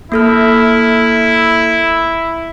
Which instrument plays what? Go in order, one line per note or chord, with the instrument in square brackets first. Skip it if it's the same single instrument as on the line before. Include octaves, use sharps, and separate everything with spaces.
[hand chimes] A#3 A4 F6 [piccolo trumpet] E4